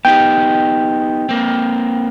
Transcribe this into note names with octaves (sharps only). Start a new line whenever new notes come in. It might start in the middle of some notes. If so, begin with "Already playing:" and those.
B3 D#4 G4 G5
A#3 C4